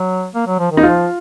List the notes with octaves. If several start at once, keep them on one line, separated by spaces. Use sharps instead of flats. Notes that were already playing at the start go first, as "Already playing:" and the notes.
Already playing: F#3
A#3
F#3
F3
D#3
D#4
F3 F4